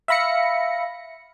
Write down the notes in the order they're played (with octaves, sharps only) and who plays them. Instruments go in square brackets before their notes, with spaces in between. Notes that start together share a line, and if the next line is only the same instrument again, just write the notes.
[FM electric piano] E5 F5 B5 A#6 C#7